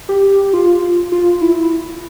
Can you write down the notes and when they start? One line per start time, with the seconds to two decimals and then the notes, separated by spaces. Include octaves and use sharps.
0.09 G4
0.53 F4
1.12 F4
1.41 E4